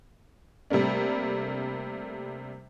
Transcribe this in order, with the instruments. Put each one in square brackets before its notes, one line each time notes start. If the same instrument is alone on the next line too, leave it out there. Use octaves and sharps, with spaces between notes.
[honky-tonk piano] C3 G3 A3 A#3 D4